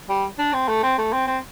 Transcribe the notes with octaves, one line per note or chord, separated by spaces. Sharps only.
G3
D4
C4
A3
C4
A3
C4
C4